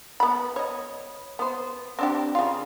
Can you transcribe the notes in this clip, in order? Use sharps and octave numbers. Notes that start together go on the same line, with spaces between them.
B3 B5
C#5 D#5
B3 C5
C4 D4 G4
C#3 F4